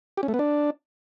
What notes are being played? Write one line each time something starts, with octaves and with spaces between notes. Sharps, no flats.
G4
C#4
A3
B3
D4